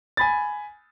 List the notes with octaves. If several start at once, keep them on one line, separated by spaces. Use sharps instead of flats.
G#5 B5 A6